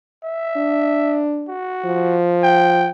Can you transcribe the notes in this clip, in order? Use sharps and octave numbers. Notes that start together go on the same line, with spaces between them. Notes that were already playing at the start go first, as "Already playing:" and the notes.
E5
D4
F#4
F3
G5